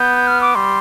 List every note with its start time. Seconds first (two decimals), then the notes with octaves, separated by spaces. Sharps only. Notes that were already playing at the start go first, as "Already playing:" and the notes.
Already playing: B3 G6
0.27 F6
0.41 D6
0.55 G3 C6